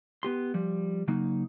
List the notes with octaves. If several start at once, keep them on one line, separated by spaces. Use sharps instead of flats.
B3 G4 C6
F3 G3
C#3 F#3 A#3 D#4